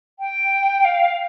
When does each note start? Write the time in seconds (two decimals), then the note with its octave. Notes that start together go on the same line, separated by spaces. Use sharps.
0.19 G5
0.85 F5